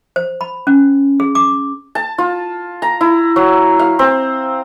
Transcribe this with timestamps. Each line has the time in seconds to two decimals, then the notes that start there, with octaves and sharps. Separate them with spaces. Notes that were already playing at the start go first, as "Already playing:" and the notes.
0.16 C5
0.41 B5
0.67 C#4
1.20 G#4
1.35 D6
1.95 A5
2.18 F4
2.82 A#5
3.01 E4
3.36 F#3
3.79 F5
3.99 C4